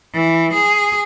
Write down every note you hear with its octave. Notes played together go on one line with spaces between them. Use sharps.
E3
G#4